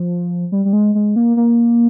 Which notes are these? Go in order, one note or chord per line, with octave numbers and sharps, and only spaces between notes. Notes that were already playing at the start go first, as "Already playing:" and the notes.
Already playing: F3
G3
G3
G#3
G#3
A#3
A#3